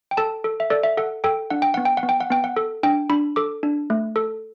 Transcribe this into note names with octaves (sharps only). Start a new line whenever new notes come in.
G5
A4 A5
A4
E5
A4 D5
E5
A4 F#5
A4 G5
D4 F#5
G5
B3 F#5
G5
F#5
B3
G5
F#5
B3 G5
F#5
A4
D4 G5
D4 B5
A4 D6
D4
A3
A4